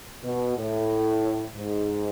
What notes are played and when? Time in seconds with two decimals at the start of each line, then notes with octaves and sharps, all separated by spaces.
0.24 B2
0.57 A2
1.55 G#2